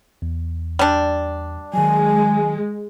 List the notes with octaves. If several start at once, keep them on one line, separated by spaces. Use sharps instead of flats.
E2
G3 D4
D#3 F#3 G#3 G#5